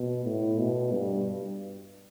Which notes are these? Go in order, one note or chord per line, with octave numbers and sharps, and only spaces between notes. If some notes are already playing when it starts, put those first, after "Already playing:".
Already playing: B2
A2
B2
G2